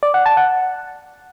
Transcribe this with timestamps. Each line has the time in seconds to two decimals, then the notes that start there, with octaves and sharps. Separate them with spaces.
0.03 D5
0.14 F#5
0.26 A5
0.37 F#5